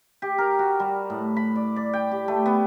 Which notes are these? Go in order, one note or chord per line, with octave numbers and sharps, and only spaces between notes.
G4
A#4
F#4
G3
A2
B5
D5
D5
G5
G4
A3
B3